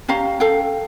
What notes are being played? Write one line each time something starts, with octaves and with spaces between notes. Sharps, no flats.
C#4 G4 F5 A#5
A4 F5 G5